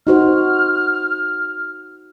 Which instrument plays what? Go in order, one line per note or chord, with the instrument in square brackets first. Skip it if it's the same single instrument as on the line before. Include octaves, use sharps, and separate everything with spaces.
[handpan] D#4 F#4 C5 [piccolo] F6